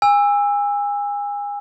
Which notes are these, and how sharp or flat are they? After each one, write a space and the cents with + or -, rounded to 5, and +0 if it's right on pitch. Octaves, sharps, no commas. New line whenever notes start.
G#5 -30 E6 +0